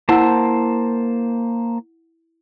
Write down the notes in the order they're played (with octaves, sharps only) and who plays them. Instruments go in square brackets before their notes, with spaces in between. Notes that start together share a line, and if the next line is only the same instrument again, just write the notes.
[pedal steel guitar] A#3 C5 A5 [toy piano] E4 F#5 E6